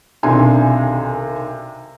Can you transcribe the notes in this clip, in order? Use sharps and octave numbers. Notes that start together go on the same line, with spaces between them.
B1 C3 D#3 D4 G#5 C6